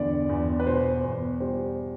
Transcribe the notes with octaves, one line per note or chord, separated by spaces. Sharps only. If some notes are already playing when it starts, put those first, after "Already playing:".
Already playing: E2 D3 D5
E2
B4
B2 C5
E2
G3 C5